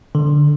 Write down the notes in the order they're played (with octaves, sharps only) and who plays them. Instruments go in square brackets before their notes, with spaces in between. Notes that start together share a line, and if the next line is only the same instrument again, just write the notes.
[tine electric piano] D3